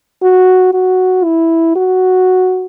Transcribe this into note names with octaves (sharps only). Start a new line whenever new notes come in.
F#4
F#4
E4
F#4